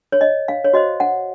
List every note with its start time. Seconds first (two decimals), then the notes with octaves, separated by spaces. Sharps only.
0.12 C#5
0.21 D#5
0.48 F5
0.65 C#5
0.73 F#4 C5 D#5
1.00 F#5